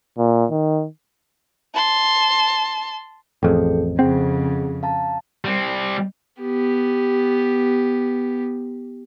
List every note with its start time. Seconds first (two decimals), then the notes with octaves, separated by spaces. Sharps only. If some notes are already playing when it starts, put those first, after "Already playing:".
0.18 A#2
0.51 D#3
1.74 A5 C6
3.43 A1 F2 G#4 A4 G5
3.99 F2 C#3 C4 G#4 F#5
4.83 F5 A5 A#5
5.45 G3 C4
6.42 B3 G4